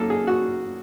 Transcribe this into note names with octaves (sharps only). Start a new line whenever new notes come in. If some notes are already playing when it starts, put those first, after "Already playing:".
Already playing: F#2 A#3 D#4 A4
G#4
F#4